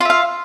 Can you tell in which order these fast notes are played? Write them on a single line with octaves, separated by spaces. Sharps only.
F4 E5 F5